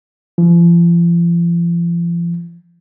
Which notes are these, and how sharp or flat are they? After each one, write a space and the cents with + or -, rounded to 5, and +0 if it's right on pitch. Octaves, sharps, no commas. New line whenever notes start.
F3 -40